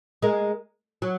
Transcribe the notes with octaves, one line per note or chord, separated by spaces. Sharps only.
G#3 A#3
F#3